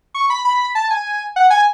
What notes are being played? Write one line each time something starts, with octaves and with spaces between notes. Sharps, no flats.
C#6
B5
B5
A5
G#5
F#5
G#5